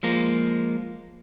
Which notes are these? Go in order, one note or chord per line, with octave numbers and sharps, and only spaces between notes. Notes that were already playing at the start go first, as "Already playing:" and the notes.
F3 G#3 A#3